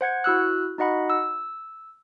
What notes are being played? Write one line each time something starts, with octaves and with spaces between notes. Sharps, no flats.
C5 F#5 G#6 C#7
E4 F#4 E6 F#6
D#4 F#4 D#5 F#5 B5
E6